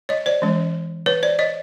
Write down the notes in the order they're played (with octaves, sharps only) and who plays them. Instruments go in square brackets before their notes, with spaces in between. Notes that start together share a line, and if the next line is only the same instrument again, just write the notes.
[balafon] C#5 D#5
C5 D5
E3 G#3 C#4
B4 C#5
C5 D5
C#5 D#5